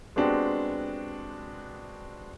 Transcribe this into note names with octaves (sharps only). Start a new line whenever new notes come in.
G#3 B3 C4 D4 F#4 G4